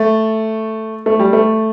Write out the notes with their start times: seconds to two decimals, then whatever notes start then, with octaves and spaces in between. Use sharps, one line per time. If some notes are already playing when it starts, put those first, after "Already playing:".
Already playing: A3
1.06 A3
1.20 G3
1.33 A3